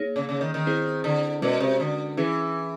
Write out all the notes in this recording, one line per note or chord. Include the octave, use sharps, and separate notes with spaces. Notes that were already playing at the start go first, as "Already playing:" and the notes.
Already playing: A#3 D#4 G#4 C#5
C#3
C#3
D#3
D#3
C4 E4 G#4 C5
D3
B2 G#3 C#4 F#4 A#4 D5
C3
D3
E3 C#4 E4 G#4